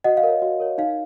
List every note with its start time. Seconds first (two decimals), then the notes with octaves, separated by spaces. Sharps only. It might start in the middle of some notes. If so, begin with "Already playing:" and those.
0.04 F#4 D#5 F#5
0.17 F5
0.23 A#4 C#5
0.42 F#4
0.60 A#4 C#5
0.78 D#4 F5